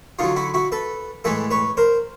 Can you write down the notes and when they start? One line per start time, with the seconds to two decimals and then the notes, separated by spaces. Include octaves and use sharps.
0.19 D3 F#3 D#4 F4
0.36 E4 F#4
0.54 E4 F#4
0.72 A4 B4
1.24 A2 E3 G#3 A4 B4
1.51 B4 C#5
1.77 A#4 C5